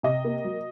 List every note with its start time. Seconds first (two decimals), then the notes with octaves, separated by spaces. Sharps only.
0.03 C3 D#5
0.25 A#3
0.44 F#3